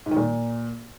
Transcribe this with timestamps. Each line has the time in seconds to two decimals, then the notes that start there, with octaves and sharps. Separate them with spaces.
0.06 G#2
0.11 D#3
0.17 A#2